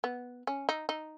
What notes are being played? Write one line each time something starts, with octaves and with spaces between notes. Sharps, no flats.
B3
C#4
D#4
D#4